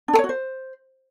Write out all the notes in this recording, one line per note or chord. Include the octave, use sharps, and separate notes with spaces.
D4
A4
C#5
F#4
C5